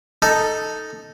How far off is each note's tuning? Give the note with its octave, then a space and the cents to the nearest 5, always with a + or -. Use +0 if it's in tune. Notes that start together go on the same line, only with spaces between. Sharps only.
D#4 +0 A4 +0